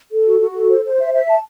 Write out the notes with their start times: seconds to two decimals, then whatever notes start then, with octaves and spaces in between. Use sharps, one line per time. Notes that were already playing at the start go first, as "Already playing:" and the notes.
0.11 A4
0.26 F#4
0.40 F#4
0.56 A4
0.70 C5
0.85 C5
0.99 E5
1.14 E5
1.28 A5